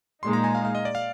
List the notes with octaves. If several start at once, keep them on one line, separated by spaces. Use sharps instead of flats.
A#2 G#3 D#4 C6
A#5
G#5
F5
F5
D#5
D5
F5